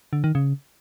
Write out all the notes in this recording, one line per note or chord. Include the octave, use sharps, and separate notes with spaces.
D3
D#3
C#3